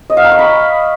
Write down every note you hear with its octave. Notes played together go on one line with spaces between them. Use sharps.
D#5
F5
A#5
C#6
B5